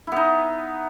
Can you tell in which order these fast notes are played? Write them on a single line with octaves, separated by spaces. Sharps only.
E4 B3 D#4